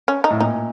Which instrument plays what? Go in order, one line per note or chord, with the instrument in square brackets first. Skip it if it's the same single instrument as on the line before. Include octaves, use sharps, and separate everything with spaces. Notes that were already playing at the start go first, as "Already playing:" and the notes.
[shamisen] C#4
D#4
[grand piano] A2
[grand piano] A#2 [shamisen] D#4